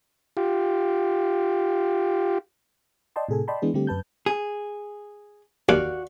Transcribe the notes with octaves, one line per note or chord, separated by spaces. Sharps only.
F4 G4
D5 D#5 G5 A5 C6
A2 C3 G#4 A4 G#5
D5 D#5 G5 A5 B5 C6
E3 G#3 B3 D4 G#4
D3 G3 A3 C4 G4
F#2 B4 A5 G6
G#4
D#2 F#4 D5 F5